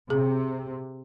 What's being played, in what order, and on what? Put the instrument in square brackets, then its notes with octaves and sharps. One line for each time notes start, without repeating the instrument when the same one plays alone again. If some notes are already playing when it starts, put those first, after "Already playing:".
[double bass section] C3 [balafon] G#4